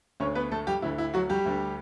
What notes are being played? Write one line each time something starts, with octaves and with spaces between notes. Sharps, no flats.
D2 D3 C#4 C#5
B3 B4
A3 A4
G3 G4
D2 D3 E4
E4
F#3 F#4
G3 G4
D2 D3